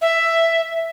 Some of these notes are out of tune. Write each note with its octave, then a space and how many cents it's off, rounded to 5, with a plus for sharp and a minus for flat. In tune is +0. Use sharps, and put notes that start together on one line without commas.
E5 +5